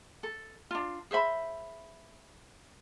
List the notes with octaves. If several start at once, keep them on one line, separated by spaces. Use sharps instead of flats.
A4
D4 F4
G#4 C5 E5 B5